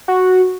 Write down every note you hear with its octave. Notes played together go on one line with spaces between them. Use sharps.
F#4